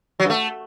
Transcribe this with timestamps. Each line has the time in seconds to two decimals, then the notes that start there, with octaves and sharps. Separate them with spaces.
0.20 F#3
0.25 G2
0.30 A3